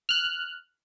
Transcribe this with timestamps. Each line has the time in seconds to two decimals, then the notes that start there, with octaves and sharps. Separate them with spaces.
0.09 F6 F#6